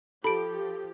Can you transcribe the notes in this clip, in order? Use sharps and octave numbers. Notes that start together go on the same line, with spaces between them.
F3 G4 A4 B5 D7